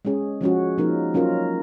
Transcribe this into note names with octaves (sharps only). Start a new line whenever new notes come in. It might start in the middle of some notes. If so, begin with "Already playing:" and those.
G#3 C#4 G#4
F3 G#3 C#4 F#4
F3 A#3 D#4 A#4
F#3 C#4 F4 A#4